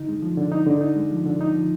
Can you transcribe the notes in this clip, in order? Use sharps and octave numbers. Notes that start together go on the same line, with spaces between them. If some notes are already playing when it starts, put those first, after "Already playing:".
Already playing: D3 D#4
G#3
F3
D3
D#4
D3
D#4
G#3
F3
D3
D#4
F3